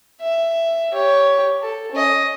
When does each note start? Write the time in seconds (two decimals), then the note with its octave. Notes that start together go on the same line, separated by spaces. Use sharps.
0.21 E5
0.93 G4 C#5
1.62 A4
1.92 C#4 D#5